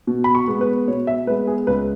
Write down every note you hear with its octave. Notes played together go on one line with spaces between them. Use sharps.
B2
B5
C#6
G#3 B3
B4
B2 C#5
E5
G#3 B3 B4
G#4
C#2 B4